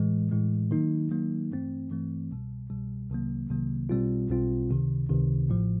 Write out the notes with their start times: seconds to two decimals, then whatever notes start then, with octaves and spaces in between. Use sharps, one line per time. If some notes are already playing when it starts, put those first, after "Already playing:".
Already playing: A2 E3 G#3
0.31 A2 E3 G#3
0.71 D#3 F#3 A#3 D#4
1.11 D#3 F#3 A#3 D#4
1.51 G2 E3 A3 C4
1.90 G2 E3 A3 C4
2.31 C2 B2 G3
2.70 C2 B2 G3
3.10 C2 C3 D#3 F#3 A#3
3.50 C2 C3 D#3 F#3 A#3
3.89 B1 B2 G3 C4 F4
4.29 B1 B2 G3 C4 F4
4.69 C#2 C3 D#3
5.09 C#2 C3 D#3
5.49 A1 A2 F3